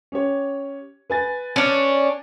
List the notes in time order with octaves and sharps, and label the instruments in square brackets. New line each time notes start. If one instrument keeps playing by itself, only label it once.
[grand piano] C#4 G4 C#5
B4 G#5 A6
[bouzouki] C#4 D4